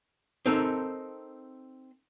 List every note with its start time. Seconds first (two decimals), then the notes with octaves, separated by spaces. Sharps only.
0.46 C4 D#4 A4 A#4